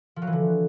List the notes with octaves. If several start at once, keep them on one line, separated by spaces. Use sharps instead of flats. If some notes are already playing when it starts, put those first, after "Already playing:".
F3
F#3
E3
D3